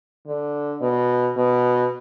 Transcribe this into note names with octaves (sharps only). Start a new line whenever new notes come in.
D3
B2
B2